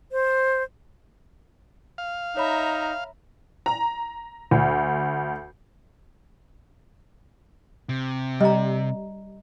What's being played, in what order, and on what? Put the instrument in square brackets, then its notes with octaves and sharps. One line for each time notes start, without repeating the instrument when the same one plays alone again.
[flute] C5
[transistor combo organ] F5
[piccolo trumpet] D#4 [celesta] C#5 B5 [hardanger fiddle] E5 A#5
[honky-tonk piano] A#5
D2
[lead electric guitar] C3
[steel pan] G3 [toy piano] D#5 A#5